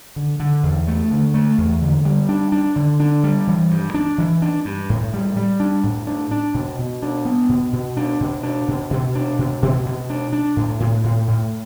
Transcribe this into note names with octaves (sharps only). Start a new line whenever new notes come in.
D3
D3
E2
A3
D3
A3
E2
D3
G3
D4
D4
D3
D4
G3
E3
G2
D4
E3
D4
G2
A2
G3
G3
D4
A2
D4
D4
B2
B2
D4
B3
B2
B2
D4
B2
D4
B2
B2
D4
B2
B2
B2
D4
D4
A2
A2
A2
A2